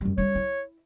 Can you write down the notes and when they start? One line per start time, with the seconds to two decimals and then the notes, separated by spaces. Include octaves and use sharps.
0.01 F#2 G3
0.18 G3 D4 C#5
0.35 E4